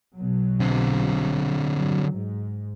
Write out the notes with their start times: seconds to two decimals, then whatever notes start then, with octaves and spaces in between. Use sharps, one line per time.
0.16 B1 B2 F#3
0.60 D3 C4
1.74 G2 F#3
2.10 G#2